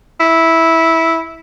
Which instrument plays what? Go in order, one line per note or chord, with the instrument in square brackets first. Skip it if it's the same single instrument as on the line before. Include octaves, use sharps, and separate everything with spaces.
[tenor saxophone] E4